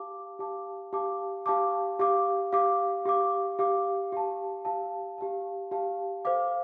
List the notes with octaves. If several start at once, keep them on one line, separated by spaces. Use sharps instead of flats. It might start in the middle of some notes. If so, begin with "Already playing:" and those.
Already playing: G4 F5 A5 D6
G4 F5 A5 D6
G4 F5 A5 D6
G4 F5 A5 D6
G4 F5 D6
G4 F5 D6
G4 F5 D6
G4 F5 D6
G4 F5 A5
G4 F5 A5
G4 F5 A5
G4 F5 A5
A4 C5 F5 D6